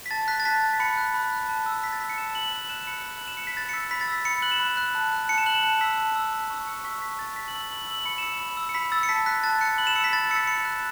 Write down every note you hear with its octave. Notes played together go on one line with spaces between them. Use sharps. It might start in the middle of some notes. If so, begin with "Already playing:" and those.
B6
A5 A6
F#6 B6
A6
A5 B6
F#6
B6
B5 C#7
F#6
B5
F#6
A5
E6
A5 B6
A6
E6 B6
C#7
A5 E7
F#6 F#7
A5 F#7
F#6 E7
B5 C#7
F#6
B5 F#7
E7
F#6 C#7
B6
B5 A6
C#7
E6 B6
B5 B6
A6
E6 B6
B5 C#7
F#6 F#7
E7
B5
F#6
A5
F#6
A5 C#7
E7
F#6 F#7
E7
A5 C#7
E6 B6
A5
E6
A5
C#6 E6
A5 C#7
C#6 E6 B6
A5 B6
E6 A6
A5 B6
F#7
E6
B5 F#7
E6 F#7
B5 C#7
E7
E6 C#7
B5
E6
C#7
B5 B6
E6 A6
C#7
A5 B6
F#6 B6
A5 A6
F#6 C#7
B5 F#7
E7
E6 C#7
B6
B5 A6
A6
E6 C#7
B6
B5 C#7
F#6 E7